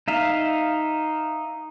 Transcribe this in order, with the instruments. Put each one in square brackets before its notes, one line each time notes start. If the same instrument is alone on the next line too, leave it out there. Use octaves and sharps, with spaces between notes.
[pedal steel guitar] D#4 E5 F5